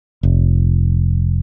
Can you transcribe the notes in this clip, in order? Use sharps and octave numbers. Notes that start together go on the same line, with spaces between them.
F1